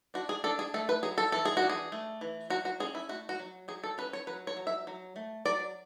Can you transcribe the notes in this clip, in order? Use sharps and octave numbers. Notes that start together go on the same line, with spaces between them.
D4 F#4
G#4
D4 A4
G#4
A3 A4
B4
F#3 G#4
A4
E3 A4
G#4
F#4
D4
G#4
A3
E3
F#3 F#4
F#4
C#4 G#4
E4
A3 F#4
F#4
F#3
F#3 G#4
A4
C#4 B4
C#5
F#3 B4
C#5
F#3
E5
F#3
A3
F#3 D5